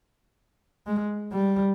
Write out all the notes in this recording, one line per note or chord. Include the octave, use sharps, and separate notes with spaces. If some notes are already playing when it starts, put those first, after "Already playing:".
G#3
G3